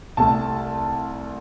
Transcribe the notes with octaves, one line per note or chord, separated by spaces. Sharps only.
C2 C3 A3 A5